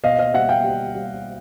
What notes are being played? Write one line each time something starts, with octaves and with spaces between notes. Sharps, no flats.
B2 D#5 F5
D#5 F5
G3 E5 F#5
F5 G5
G3
G3